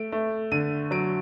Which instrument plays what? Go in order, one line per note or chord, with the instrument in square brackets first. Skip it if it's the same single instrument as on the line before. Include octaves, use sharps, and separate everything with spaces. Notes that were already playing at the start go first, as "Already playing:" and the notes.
Already playing: [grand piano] A3 D7
A3
D3 D#7
F#3 D7